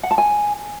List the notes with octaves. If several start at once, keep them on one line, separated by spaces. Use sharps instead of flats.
F#5
A5
G#5